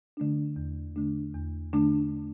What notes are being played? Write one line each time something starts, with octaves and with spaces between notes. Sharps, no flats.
D3 A3 D4
E2
D3 A3 D4
E2
D3 A3 D4